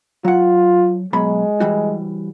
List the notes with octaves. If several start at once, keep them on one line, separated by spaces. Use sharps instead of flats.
F#3 F4 F#5
B2 F#3 G#3 B5
E3 G3 F#4